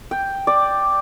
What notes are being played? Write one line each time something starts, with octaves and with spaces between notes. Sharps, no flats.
G5
D5